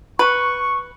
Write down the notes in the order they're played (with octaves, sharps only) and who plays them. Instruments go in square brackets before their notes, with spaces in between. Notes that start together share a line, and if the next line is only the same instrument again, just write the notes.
[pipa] B4 [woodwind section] C#6